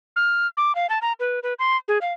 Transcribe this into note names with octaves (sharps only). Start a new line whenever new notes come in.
F6
D6
F5
A5
A#5
B4
B4
C6
G#4
F5